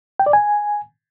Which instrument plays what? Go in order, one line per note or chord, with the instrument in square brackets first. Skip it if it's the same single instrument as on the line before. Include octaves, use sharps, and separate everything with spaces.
[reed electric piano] G5
D5
G#5